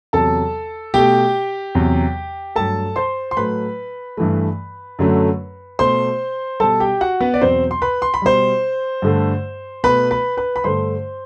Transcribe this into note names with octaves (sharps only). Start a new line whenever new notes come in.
E2 C3 F#3 A4 A5
B2 A3 G4 G5
E2 C3 F#3
G2 F#3 A3 A4 A5
C5 C6
C6
A2 F#3 A3 B4 B5
G2 E3 A3
F#2 D3 F#3 A3
B2 A3 C5 C6
B2 G3 A4 A5
G4 G5
F#4 F#5
B3 B4
D5
E2 B2 F#3 C4 C5
C6
B4 B5
C6
B5
B2 G3 C5 C6
G2 D3 A3
B2 A3 B4 B5
B4 B5
B4 B5
B5
G2 D3 A3 C5 C6